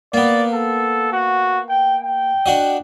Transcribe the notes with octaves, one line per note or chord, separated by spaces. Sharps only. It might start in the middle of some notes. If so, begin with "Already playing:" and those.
A#3 B3 D5
A4
F#4
G5
G5
D4 F#4 D#5